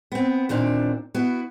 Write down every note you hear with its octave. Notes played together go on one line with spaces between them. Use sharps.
B3 C4
D#2 A#2 C4 D4
B3 E4 F#4